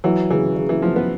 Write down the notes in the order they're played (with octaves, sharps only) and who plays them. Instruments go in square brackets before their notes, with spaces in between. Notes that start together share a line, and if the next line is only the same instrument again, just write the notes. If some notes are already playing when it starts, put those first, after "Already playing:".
[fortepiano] E3 [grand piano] F#3
[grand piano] C#3 [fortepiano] E3
[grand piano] C#3
[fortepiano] E3
[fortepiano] F3 [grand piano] F#3
[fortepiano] B3